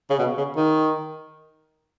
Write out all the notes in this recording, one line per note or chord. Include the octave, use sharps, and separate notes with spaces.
C#3
B2
C#3
D#3